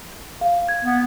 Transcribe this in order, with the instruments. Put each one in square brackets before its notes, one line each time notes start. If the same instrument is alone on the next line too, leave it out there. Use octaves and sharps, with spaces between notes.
[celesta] F5
G#6
[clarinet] B3